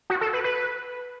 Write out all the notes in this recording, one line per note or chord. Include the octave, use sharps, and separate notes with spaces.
F#4
A4
B4
B4